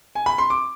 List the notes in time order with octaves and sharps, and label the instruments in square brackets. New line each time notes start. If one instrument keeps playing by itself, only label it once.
[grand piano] G#5
B5
C6
D6